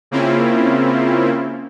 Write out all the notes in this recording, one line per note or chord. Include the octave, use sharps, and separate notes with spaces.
C#3 A#3 C4 C#4 E4 F4